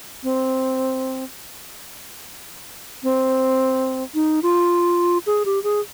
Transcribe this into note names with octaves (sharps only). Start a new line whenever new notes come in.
C4
C4
D#4
F4
G#4
G4
G#4